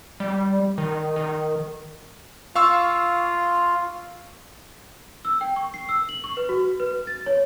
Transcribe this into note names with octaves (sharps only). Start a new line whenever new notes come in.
G3
D#3
D#3
F4 F5 C#6 E6
E6
G5
C#6
C7
E6
F#7
C#6
B4
F#4
B4
A6
C#5